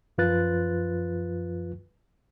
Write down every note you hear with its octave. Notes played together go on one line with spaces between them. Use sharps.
F#2 F3 F4 B4 F#6 A6